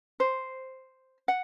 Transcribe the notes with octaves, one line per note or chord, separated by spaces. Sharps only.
C5
F#5